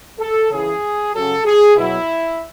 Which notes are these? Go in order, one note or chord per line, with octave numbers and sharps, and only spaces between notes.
A4
C#3 E3 G#4
C#3 F#3 A4
G#4
B2 F#3 E4